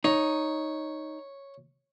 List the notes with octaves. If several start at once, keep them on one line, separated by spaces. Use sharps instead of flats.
D#4 C#5